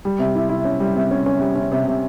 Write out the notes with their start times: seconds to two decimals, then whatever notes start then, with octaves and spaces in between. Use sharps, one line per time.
0.05 G3
0.19 C3
0.35 E4
0.49 E4
0.65 C#4
0.80 G3
0.96 C3
1.11 C#4
1.26 C#4
1.41 G3
1.56 C#4
1.72 C3
1.87 C3